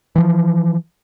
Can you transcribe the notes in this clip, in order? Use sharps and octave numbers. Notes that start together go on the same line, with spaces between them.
E3 F3